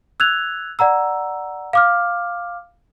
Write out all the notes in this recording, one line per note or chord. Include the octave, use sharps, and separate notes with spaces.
E6 F#6 G#6 F7
D5 F#5 A#5 E6
F5 D6 F6